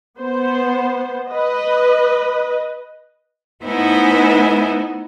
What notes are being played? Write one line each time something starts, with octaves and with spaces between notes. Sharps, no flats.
B3 C5
B4 D#5
A3 B3 D#4 E4 C5 G#5